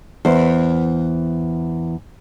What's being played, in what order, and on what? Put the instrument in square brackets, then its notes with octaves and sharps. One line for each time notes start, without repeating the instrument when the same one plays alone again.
[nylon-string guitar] E2 C5